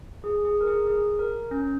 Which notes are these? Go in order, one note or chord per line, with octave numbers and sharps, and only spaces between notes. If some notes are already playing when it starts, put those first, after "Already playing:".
G#4
G#4
A#4
G#4
G#4
A#4
C#4